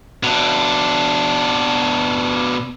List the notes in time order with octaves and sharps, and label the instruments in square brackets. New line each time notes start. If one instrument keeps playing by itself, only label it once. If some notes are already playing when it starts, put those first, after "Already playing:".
[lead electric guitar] B2 D4